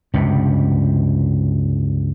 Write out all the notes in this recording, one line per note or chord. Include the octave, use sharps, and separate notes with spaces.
C#2 G2 C3